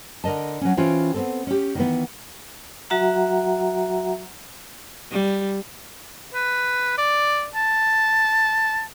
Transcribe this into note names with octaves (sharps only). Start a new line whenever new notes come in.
D3 A#4 D#5 A5
F#3 C#4
E3 C#4 F4 C5 G5
B3 C4 A4
C#4 G4
D#3 E3 B3
F#3 F#4 E5 F#5 A#5
G3
B4
D5
A5